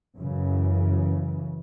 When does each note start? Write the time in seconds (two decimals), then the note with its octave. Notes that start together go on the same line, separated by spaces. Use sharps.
0.18 F#2 C#3 E3